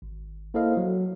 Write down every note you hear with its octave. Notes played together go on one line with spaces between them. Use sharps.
G#1
A#3 E4 A4 C5 D#5 F5
F#3